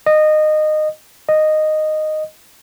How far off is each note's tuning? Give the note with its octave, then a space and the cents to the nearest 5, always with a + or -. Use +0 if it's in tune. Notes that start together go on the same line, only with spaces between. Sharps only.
D#5 -20
D#5 -10